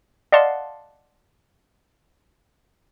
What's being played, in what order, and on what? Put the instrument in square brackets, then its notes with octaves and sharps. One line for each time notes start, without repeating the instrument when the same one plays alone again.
[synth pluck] D5 D#5 F5 F#5 A5 C6